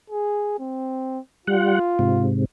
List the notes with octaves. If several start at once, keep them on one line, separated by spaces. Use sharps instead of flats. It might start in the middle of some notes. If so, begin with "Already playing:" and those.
G#4
C4
G3 F4 F#5
G#2 C3